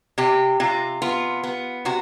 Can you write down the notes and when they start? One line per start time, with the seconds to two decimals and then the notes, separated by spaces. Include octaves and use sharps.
0.18 C3 G4
0.60 C3 F4
1.02 B3 F4
1.43 B3
1.85 C3 F#4